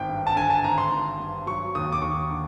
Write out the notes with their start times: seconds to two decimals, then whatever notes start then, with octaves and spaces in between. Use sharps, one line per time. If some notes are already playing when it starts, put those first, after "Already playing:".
Already playing: G#1 G5
0.09 G2
0.27 A5
0.36 D3 G#5
0.50 A5
0.64 G#1 A#5
0.78 C6
0.91 G#1
1.20 G2
1.46 F#3 C#6
1.75 D#2 D#6
1.92 D6
2.02 D#2 C#6
2.30 D3